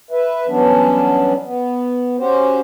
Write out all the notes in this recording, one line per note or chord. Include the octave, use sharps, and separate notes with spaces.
B4 E5
E3 F#3 G3 B3 C#4 D4
B3
C#4 F#4 G4 C5